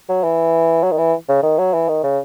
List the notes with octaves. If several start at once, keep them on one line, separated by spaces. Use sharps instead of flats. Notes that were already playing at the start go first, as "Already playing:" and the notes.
F#3
E3
F#3
D#3
E3
C#3
D#3
F#3
E3
D#3
C#3